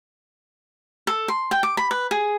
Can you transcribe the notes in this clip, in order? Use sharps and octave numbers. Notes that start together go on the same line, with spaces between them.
A4
C6
G5
D6
B5
B4
G#4